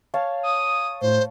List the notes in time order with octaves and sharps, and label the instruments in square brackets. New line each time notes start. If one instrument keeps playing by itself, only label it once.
[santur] C#5 F5 A5
[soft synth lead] D#6
[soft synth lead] A2 [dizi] C5